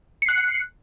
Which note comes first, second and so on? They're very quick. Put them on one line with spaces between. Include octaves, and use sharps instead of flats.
C#7 C7 F#6